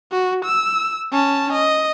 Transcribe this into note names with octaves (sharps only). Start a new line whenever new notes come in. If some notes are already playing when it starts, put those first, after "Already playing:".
F#4
E6
C#4 A5
D#5